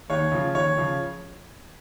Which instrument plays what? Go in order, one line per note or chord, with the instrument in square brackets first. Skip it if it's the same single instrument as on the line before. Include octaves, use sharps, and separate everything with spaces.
[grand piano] D#2 C#5
C#3 F3
D#2 C#5
C#3 F3